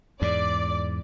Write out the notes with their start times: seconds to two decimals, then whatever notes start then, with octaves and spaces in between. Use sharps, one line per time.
0.22 E2 G#2 D5